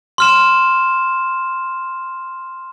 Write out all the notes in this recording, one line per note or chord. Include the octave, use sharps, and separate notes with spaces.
C6 F6 E7